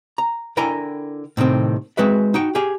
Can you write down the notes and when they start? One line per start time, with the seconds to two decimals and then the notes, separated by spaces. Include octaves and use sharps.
0.18 A#5
0.57 D3 E4 A#4 G5 G#5 A#5
1.37 A2 C3 D#3 C4
1.97 G#3 C4 F#4 B4 E5
2.34 D#4 F#4 G5
2.55 G4 G#4 F5 G#5